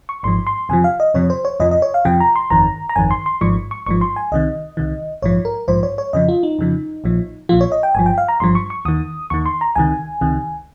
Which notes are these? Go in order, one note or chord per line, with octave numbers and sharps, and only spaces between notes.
C#6
G#1 G#2 F3 C6
C6
F2 C3 F3 G#5
F5
D#5
F2 C3 F3 C#5
C5
C#5
F2 C3 F3 D#5
D#5
C#5
F5
F2 C3 F3 G5
A#5
C6
G1 F2 D#3 A#5
A#5
G1 F2 D#3 G#5
C6
C6
G#1 G#2 F3 C#6
C#6
G#1 G#2 F3 C#6
C6
G#5
C2 C3 D#3 D#5
C2 C3 D#3
A#1 G#2 F3 C#5
A#4
A#1 G#2 F3 C5
C#5
C#5
F2 C#3 F3 D#5
F4
D#4
F2 C#3 F3
A#1 A#2 F3
A#1 A#2 F3 F4
C#5
D#5
G5
G1 G2 F3 G#5
G5
F5
A#5
G1 G2 F3 C6
C#6
C#6
D#2 D#3 D#6
D#2 D#3 C#6
C6
A#5
C#2 C3 D#3 G#5
C#2 C3 D#3